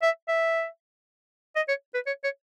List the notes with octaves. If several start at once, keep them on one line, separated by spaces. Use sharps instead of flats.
E5
E5
D#5
C#5
B4
C#5
C#5